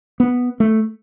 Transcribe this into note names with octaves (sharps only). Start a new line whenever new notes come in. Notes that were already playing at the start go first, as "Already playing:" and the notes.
B3
A3